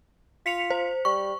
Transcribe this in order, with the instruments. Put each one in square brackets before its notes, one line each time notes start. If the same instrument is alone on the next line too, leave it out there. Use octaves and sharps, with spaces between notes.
[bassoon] F4 [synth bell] B6 C#7 F7
[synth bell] C5
[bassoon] G3 [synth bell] C#6